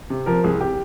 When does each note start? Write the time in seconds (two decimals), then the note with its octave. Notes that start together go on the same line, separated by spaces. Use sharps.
0.10 C3
0.26 F3 A#4
0.44 C2 G#4
0.61 G4